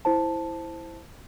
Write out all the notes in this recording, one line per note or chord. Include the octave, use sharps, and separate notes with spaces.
E4 C5 A5